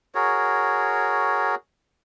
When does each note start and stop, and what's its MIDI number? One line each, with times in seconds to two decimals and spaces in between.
0.15 1.55 66
0.15 1.55 68
0.15 1.55 70
0.15 1.55 73